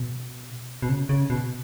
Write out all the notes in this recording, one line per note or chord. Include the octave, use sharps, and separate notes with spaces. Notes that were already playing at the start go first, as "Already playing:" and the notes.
Already playing: B2
B2
C#3
C#3
B2